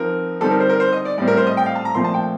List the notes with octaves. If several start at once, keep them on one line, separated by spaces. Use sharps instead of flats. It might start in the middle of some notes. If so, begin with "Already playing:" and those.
Already playing: F3 C4 D#4 A#4
D3 G3 C4 D#4 A4
A#4
C5
A#4
C5
D#5
D5
A2 G3 C4 D5
A#4
C5
D#5
G5
F5
A5
A#5
A#2 F3 A3 C4 C6
A5
G5